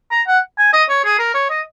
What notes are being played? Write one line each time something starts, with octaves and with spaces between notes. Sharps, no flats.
A#5
F#5
G#5
D#5
C#5
G#4
A#4
C#5
D#5